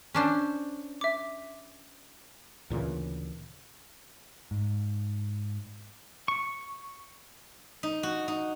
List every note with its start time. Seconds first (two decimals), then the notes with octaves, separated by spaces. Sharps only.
0.15 C#4 D4 C5
1.01 E5 D6
2.70 D2 A#2 C#3 E3
4.51 G#2
6.28 C#6
7.83 D#4
8.03 F#4
8.28 D#4